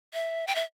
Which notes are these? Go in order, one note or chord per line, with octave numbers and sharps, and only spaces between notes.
E5
G5
E5